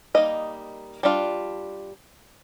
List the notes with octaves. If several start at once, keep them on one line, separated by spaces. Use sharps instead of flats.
G3 A#3 D#4 D#5
G3 D4 F4